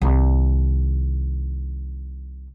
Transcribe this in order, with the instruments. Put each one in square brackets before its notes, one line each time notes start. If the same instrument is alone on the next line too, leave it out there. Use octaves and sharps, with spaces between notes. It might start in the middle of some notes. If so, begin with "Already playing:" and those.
[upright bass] C2 D#3